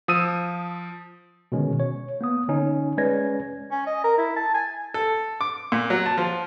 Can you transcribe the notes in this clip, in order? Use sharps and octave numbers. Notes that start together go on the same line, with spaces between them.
F3 D#6 E6 D#7
B2 D3 D#3 G#3 C#4
C#5
A#3 B3 D#6
D3 C#4 D#4
G#3 C#4 B4 D5 G#6 A#6
C#4
D#5
A#4
E4
A5
G#5
A4
D6
A#2
F#3
A5
F3